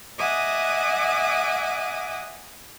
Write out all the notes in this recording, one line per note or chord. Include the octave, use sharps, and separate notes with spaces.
D#5 E5 F#5 G#5 D6 D#6